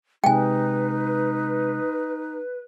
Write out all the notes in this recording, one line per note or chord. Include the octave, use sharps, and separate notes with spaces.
C3 G#3 D#4 B4 G5 G#5